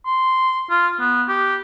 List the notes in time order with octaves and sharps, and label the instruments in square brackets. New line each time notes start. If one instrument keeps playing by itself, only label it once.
[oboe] C6
F4
B3
G4